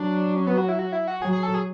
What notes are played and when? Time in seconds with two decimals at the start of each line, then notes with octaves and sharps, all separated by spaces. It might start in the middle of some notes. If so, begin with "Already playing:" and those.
Already playing: F#3 D4
0.36 C#4
0.47 B3
0.58 F#4
0.69 E4
0.79 F#4
0.92 E4
1.08 F#4
1.22 F#3 G#4
1.32 G#4
1.43 A4
1.54 G#4